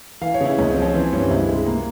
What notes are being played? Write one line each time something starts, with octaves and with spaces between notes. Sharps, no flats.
E3 F5
C#5
C#3 E4
C#2 C#4
C4
F3
C#4
E3 C4
G2 C#4
C#2 E4
C3 G#3
A#3